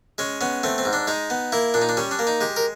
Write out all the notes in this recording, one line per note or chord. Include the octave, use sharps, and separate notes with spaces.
G#3 C#4
B3 C#4
A3 C4
C4
G#2
D4
G#3 D#4
B3
A#3 E4
A#2 D4
D#4
D4
G3 C#4
D4
A#3
D#4
G#3 G4
A#4